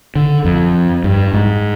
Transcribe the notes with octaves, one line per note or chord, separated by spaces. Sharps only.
D3
F2
G2
G#2